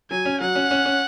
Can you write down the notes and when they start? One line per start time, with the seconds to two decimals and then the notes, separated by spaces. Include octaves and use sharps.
0.11 F#3 G#5
0.25 C#4
0.41 F#3 F#5
0.55 C#4
0.71 C#4
0.85 C#4